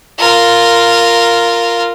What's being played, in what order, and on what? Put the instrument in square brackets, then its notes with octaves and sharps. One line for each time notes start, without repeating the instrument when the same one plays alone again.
[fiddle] F4 A#4